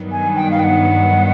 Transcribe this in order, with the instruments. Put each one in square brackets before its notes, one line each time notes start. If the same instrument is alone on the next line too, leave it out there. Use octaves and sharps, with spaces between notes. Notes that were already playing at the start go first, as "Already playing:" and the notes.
Already playing: [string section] G2 D#3 F#3 B3
[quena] G#5
G5
F5
G5
F#5